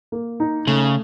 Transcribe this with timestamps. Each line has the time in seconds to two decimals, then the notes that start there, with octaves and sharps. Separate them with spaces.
0.12 A#3
0.40 D#4
0.67 C#3 A3